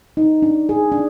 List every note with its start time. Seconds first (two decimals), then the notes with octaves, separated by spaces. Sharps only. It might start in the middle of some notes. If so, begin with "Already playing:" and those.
0.17 D#4
0.42 D4
0.69 G#4
0.92 D4